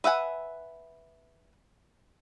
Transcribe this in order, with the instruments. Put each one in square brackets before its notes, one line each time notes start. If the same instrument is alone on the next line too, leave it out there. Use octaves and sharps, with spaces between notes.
[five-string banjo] B4 E5 F#5 G#5